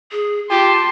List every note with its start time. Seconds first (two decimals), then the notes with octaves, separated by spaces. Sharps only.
0.11 G#4
0.50 F4 G4 A5 C6